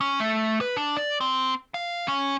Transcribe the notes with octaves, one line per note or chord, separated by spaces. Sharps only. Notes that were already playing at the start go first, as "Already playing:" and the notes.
C#4
A3
B4
D4
D5
C4
F5
C#4